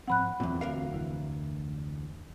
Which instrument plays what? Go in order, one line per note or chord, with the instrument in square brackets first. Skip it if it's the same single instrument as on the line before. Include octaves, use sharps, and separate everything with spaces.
[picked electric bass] G#2 F3 C4 [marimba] F#5 B5 F#6
[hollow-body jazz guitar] E2 A#2 [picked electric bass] F#3 C4
[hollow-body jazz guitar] D2 A#4 F5
[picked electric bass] F1 E3